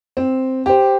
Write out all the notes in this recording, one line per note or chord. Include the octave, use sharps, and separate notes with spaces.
C4
G4 C5